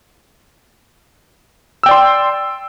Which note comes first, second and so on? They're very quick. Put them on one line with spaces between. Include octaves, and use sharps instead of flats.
E6 G5 D5 C6